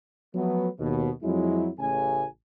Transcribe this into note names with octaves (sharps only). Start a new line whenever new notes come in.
F3 F#3 A3 B3
D#2 B2
F2 F#3 G#3 E4
A1 C#3 G#5